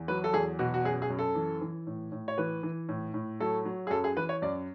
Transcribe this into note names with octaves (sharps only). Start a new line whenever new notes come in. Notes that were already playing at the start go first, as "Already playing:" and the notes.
Already playing: E2
F#3 B4
A4
E2 G#4
B2 F#4
F#4
F#2 G#4
G#4
F#2
A4
E3
E3
A2
A2
C#5
E3 B4
E3
A2
A2
F#3 A4
F#3
G#4
F#2 A4
G#4
E3 B4
C#5
F#2 D5